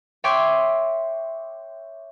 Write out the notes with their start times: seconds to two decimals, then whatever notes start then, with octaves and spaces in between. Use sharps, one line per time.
0.24 C#5 E5 G5 C6 D6 G#6